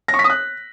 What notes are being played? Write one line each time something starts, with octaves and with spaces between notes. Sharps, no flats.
A#6
C#6
B6
D#6
F#6